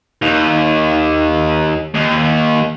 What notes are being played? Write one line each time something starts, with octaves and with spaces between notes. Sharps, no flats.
D#2
D#2